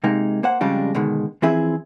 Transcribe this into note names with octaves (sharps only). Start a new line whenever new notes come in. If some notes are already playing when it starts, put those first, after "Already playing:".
C3 G#3 A#3 D#4
A#3 C5 F#5
F2 C#3 G3 G#3 D4 F4
B2 D3 D#3 G#3
E3 F3 C4 E4 G#4 E5